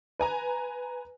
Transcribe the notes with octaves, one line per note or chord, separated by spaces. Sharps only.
B4 G#5 A#5